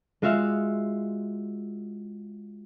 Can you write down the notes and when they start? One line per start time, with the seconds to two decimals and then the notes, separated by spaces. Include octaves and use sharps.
0.22 G#3 F4 F#4 E5 F5